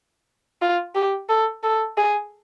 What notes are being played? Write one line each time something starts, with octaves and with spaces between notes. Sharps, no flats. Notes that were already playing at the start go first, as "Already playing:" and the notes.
F4
G4
A4
A4
G#4